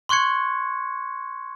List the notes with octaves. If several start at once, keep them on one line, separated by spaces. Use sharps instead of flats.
C6 C#6 F#6 G#6 C#7